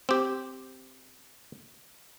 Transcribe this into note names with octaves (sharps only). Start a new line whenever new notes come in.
C4 G4